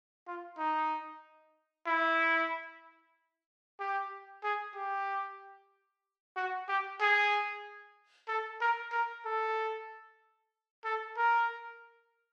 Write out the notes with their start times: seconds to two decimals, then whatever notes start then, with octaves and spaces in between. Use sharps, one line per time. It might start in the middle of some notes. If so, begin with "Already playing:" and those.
0.27 F4
0.58 D#4
1.87 E4
3.80 G4
4.43 G#4
4.75 G4
6.36 F#4
6.69 G4
7.01 G#4
8.28 A4
8.61 A#4
8.92 A#4
9.25 A4
10.85 A4
11.17 A#4